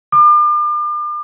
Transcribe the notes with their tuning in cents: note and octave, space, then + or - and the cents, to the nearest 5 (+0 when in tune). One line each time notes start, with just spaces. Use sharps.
D6 +40